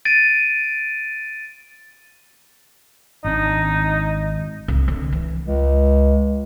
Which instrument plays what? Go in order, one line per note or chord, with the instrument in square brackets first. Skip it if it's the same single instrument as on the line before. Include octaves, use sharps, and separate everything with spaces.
[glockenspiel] A6 D7 D#7
[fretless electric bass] G#1 D4 [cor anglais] D#4
[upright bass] C2
D3
E3
[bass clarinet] C#2